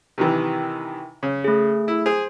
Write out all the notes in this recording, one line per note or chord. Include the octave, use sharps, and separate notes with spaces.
C3 D#3 E3
C#3
A3 G#4
E4
G#4 C5